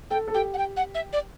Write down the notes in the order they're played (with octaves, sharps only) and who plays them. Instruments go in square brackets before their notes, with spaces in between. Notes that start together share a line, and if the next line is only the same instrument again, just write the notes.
[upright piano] A4 [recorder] G5
[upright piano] A4
[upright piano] G4 [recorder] G5
[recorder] F#5
G5
F#5
E5
D5